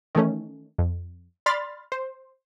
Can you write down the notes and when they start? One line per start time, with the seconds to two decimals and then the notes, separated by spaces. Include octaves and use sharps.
0.15 D#3 E3 A3 C#4
0.78 F2
1.46 D5 B5 C6 F6 A6
1.92 C5